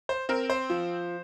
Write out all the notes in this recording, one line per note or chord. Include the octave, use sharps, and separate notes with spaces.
C5
C4 A#4
C5
F3